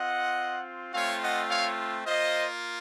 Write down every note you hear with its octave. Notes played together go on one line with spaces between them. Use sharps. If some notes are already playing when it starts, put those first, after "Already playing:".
Already playing: C4 F4 D#5 F#5
A3 C4 F4 C#5 F5
D#5 F#5
C#5 F5
A#3 F4 C5 D#5